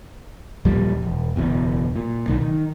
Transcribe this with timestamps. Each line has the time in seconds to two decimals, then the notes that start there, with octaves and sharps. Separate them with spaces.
0.65 D#2 A#2 F3 G3
1.02 E1
1.36 F#1 E2 B2
1.96 A#2
2.28 B1 D#3
2.40 D#3